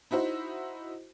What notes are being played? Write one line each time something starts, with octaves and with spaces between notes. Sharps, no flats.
D#4 E4 F#4 C5